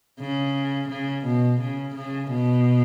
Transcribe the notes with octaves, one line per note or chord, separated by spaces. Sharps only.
C#3
C#3
B2
C#3
C#3
B2